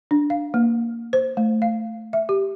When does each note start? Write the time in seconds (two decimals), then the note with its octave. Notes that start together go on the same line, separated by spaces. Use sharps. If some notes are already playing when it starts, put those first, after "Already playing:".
0.11 D4
0.30 F5
0.54 A#3
1.13 C5
1.37 A3
1.62 F5
2.13 E5
2.29 G4